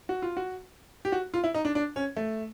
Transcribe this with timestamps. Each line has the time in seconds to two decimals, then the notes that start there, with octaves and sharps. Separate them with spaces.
0.09 F#4
0.22 F4
0.37 F#4
1.05 G4
1.12 F#4
1.34 F4
1.44 E4
1.54 D#4
1.65 D4
1.75 D4
1.96 C#4
2.17 A3